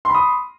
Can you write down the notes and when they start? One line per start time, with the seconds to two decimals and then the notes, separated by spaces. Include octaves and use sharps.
0.05 C6
0.10 B5
0.15 D#6